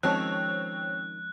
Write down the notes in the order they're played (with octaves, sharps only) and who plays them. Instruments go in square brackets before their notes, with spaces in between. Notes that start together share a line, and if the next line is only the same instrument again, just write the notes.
[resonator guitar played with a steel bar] D#3 A5 [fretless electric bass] F3 G#3 C#4 [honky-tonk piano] C4 C#5 [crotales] F#6